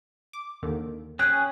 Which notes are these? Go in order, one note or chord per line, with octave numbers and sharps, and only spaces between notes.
D6
D#2 D3 D#3
C#4 G#4 G5 G#5 F#6